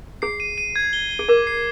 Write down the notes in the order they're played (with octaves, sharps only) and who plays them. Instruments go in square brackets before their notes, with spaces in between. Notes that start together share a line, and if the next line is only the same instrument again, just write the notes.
[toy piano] G#4 [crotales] C7
[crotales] D#7
D#7
G#6
G7
G7
[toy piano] G#4
[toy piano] A#4 [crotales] D6
[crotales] C7